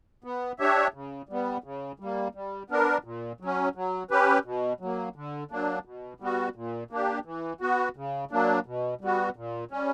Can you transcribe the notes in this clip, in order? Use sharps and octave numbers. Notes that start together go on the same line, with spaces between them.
B3
D4 G4 C#5 E5
C#3
G3 B3
C#3
G3 A#3
G3
B3 D4 A#4
A#2
F#3 C#4
F#3
C#4 G4 B4
B2
F#3 A#3
D3
F#3 A#3 D4
B2
G3 B3 F#4
A#2
A#3 D4 G4
E3
B3 F#4
C#3
F#3 A#3 D4
B2
G3 B3 F#4
A#2
G3 C#4